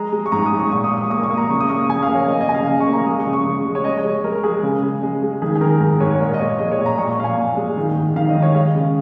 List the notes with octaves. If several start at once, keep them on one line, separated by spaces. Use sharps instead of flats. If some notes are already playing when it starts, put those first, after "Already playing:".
Already playing: G#3 A#5
G#3
C#6
G#2 A#5
D#6
G#2
C#6
A#2 C#6
D#6
A#2
C#6
A#3 D#6
C#6
A#3
A#5
C#3 C#6
D#6
A#3 C#6
C#3 G#5
F5
A#3
C#5
A#3 D#5
D#5
C#3 G#5
F5
C#3 F5
C#6
A#3
A#5
G#3 D#6
C#6
C#3
C#6
C#3
G#3
C#5
G#3 D#5
C#5
G#3
G#3 A#4
G#3 G#4
C#3
C#3
G#3
G#3
D#3 G#4
G#4
D#3 A#4
G#2 A#4
G#2 C#5
C#5
A#2 A#4
D#5
A#2 C#5
G#3 D#5
C#5
A#2
A#5
A#2 C#6
C#6
A#2 F5
G#5
A#2
G#3
D#3
G#2
D#3 F5
D#5
D#3
C#5
G#3 F5
C#3